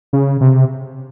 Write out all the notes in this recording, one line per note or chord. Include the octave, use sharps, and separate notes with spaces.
C#3
C3